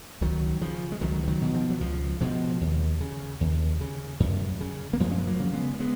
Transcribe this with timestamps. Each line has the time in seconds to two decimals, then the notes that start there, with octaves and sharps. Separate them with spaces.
0.21 C#2 D#3 F#3
0.61 C#3 F3
0.92 G#3
1.01 C#2 D#3 F#3
1.23 F3
1.28 D#3 F#3
1.41 B2
1.54 F3
1.70 F#3
1.81 C#2 F3
2.21 B2 F3 G#3
2.61 D#2
3.00 C#3
3.41 D#2
3.81 C#3
4.20 F#2
4.61 C#3
4.93 A#3
5.00 F#2 F3 G#3
5.11 C#4
5.18 B3
5.27 F#3 A#3
5.39 C#3
5.53 G#3 B3
5.74 A#3
5.80 G#3 B3